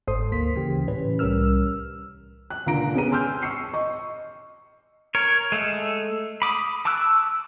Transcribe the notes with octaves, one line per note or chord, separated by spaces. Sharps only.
G1 G#2 A4 C5 C6 D#6
D2 A#3 C6 B6
C#3 E3 G4
A2 E3 C#4 B4
C2 G3 C#4 A#4 E6 F6
F#6
C#2 A#2 D3 A#5 D7
B3 C#4 G#4 A#5 D#7
G#5 C6 E6 F6 G6
C#6 E6 C7 C#7
D#5 C#6
A#4 C#5
G#3 A3 A4
B5 D6 D#6
A5 C#6 D6 E6 F#6